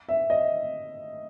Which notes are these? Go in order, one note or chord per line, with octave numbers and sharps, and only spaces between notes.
E5
D#5